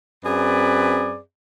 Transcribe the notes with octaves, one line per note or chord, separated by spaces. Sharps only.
F#2 C4 G#4 B4 D5